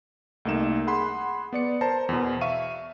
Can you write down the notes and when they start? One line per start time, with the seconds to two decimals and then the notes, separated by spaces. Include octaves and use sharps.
0.45 C2 A3 A#3 D#4 E7
0.87 G#4 F#5 B5 C6
1.53 B3 D5 C#7
1.81 A#4 C5 A5 A#5
2.09 E2 B2
2.41 E5 F5 C#6 D#7